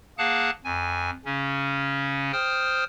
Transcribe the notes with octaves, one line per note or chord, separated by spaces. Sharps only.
A#3 G#4 F5 F#5 A5 F#6
F2 G#5
C#3 C#4
C5 G5 D#6 F6